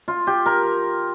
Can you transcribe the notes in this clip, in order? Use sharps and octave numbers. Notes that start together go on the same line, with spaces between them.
F4
G4
A#4